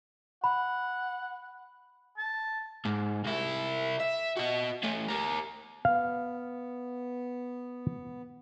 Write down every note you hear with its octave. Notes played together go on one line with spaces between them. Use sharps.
F#5 B5
A5
G#2
C2 E4
E5
F#4 D#5
A3 C#4
G4 A#4
B3 F5